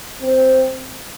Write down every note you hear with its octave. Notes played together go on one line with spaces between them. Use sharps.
C4